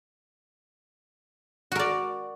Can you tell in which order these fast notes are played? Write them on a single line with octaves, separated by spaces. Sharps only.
F#4 A#4 D5